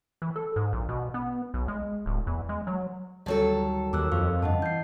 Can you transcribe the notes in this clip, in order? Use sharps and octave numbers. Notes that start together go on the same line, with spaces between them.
E3
A4
G#2
A#1
B2
B3
B1
G#3
D1
E2
G#3
F#3
D2 D#3 F#3 G3 A4 A5
D#2 D6 E6 F#6
F2 A#4 C5 F5 C#6
G2 C#3 D#5 F#5 A5
E3 G6 C7